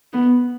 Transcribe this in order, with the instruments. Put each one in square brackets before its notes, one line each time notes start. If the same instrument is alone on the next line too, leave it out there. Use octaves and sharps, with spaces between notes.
[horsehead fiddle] B3